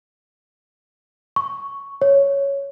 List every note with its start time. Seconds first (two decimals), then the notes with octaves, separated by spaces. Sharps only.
1.36 C#6
2.02 C#5